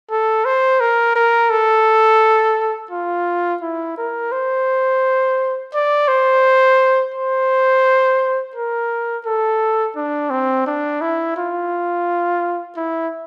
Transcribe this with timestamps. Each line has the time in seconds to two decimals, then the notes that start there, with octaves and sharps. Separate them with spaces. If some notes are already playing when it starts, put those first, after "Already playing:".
0.11 A4
0.45 C5
0.80 A#4
1.16 A#4
1.50 A4
2.91 F4
3.62 E4
3.98 A#4
4.32 C5
5.74 D5
6.08 C5
7.14 C5
8.56 A#4
9.26 A4
9.96 D4
10.30 C4
10.67 D4
11.01 E4
11.37 F4
12.77 E4